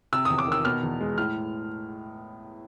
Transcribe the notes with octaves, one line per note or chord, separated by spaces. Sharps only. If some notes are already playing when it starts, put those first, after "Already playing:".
C3 E6
E2 D#6
D6
D#3 E6
B2 F6
E2
G#3
A2 F6